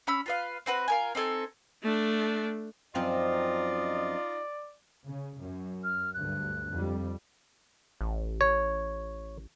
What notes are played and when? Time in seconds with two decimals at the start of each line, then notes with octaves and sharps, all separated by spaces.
0.07 C#4 B5 E6
0.26 F4 B4 F5
0.66 C4 F#4 B4
0.88 F4 A#4 G#5
1.15 C4 D#4 A4 G#5
1.83 A3 D4
2.95 F#2 F3 C4 D#4 F4 D5 D#5
5.05 C#3
5.39 F#2
5.84 F6
6.14 D2 G2 F#6
6.69 F2 G3
8.01 A1
8.41 C#5